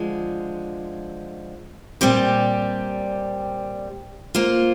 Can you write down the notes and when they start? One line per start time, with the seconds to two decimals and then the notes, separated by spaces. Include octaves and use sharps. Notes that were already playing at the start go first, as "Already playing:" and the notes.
Already playing: D3 F3 G#3
2.01 A#2 G3 C4 G4 D5
4.35 A#3 F4 C5